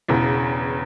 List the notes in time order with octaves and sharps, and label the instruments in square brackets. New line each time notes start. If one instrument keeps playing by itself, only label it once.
[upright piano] E1 E2 C#3